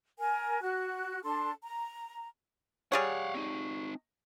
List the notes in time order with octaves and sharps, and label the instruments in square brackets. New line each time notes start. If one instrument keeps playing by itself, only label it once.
[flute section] A#4 G#5
F#4 F#6
D4 A4 A5 C6
A#5
[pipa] G3 G#4 C#5 [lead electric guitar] F5 F#5
[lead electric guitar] C4 D#4